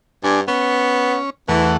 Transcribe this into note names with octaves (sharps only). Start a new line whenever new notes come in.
G2 D4 G#5
B3 C#4
E2 E3 A3 F#5